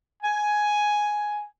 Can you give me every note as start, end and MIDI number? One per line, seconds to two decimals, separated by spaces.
0.23 1.45 80